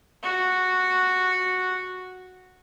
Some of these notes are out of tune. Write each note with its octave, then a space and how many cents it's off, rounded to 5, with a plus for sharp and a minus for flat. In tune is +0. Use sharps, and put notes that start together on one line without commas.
F#4 -5